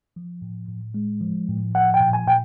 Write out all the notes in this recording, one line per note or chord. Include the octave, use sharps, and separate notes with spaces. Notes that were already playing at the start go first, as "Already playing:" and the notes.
F3
A2
A2
G#3
F3
A2
F3 F#5
G5
A#2
G#5
A#2 G5